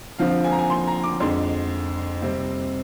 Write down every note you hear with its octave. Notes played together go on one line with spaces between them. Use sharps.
D3 F3 C4 F5
G#5
A#5
G#5
C6
A#5
D6
F2 D3 G#3 C6
C3 G3 C4